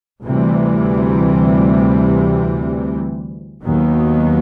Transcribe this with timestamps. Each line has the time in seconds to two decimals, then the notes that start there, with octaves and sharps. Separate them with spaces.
0.24 D2 C3 E3 G3
3.64 D#2 D#3 F#3 B3